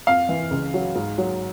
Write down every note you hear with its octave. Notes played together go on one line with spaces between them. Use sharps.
F2 F5
E3
C#2
F#3
G#2
F#3